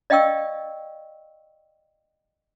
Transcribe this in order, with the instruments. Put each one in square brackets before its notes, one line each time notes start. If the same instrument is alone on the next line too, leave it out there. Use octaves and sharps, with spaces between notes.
[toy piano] D5 D#5 F5 G5 C#6 E6